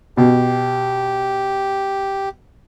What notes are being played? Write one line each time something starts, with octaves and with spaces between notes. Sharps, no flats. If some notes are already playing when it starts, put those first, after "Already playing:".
B2 G4